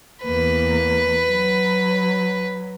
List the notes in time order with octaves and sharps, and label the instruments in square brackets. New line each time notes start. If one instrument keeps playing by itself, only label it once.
[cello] E2 A#3 [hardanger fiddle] B4
[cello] F#3